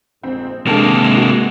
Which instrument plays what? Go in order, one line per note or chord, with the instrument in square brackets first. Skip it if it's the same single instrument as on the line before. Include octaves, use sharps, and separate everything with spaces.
[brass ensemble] A#1 F2 G#2 [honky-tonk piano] C4
[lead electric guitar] C3 A#3 [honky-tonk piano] D#3 D4 A4 [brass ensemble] G#3
[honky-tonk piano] F#4